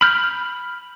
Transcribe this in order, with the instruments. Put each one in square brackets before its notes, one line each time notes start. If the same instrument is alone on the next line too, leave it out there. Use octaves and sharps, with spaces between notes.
[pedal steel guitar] B5 F6 G6